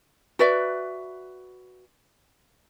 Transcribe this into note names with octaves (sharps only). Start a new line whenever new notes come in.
F#4 B4 D5 E5